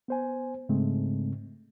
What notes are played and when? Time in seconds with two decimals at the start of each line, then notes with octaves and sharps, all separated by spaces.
0.08 B3 C5 G#5
0.69 G#2 C#3 G#3 A3 C4